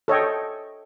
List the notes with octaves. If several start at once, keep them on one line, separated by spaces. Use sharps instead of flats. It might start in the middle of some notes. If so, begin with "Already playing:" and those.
A4 C#5 D#5 G5